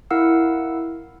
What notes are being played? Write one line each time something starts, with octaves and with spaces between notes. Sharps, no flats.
E4 A#4 F5 F#5 E6